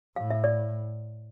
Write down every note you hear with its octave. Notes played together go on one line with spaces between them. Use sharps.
A2 F5
E5
D5